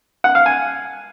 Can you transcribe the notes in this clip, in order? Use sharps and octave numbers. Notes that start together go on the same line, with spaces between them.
F#5
F5
G#5